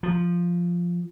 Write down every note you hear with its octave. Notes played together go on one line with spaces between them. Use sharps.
F3